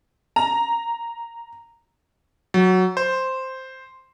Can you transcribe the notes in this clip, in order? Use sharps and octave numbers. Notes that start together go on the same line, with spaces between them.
A#5
F#3
C5